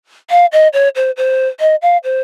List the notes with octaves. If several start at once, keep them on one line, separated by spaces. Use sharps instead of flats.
F5
D#5
C#5
C5
C5
D#5
F5
C5